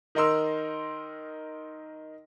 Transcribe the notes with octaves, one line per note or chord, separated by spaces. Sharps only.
D#3 D#4 A#4 C6 E6